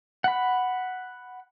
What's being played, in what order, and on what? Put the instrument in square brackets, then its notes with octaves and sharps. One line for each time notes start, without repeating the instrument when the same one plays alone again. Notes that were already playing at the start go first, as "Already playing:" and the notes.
[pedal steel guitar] F#5 B5